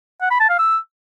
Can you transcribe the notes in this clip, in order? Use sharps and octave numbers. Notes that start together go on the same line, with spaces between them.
F#5
B5
A5
F5
E6